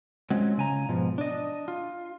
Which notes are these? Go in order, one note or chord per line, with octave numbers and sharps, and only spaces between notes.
F#3 G#3 C4 C#4 F4 C#5
C#3 G#5 A#5
G#2 B2 F3
D4 D#5
F4